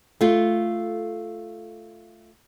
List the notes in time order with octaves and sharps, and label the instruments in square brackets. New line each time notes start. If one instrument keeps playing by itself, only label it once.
[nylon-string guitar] A3 F4